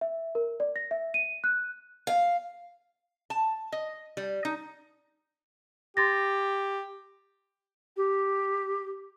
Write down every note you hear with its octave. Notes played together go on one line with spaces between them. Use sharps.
E5
A#4
D5
A#6
E5
D#7
F#6
F5
A5
D#5
G3
D#4
G4 C6 A6 A#6
G4